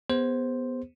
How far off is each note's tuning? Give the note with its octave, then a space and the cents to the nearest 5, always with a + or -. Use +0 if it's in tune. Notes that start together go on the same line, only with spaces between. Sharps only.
B3 +0 G#4 -25 C5 +0